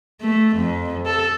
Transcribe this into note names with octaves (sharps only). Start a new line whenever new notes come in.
A3
F2
A4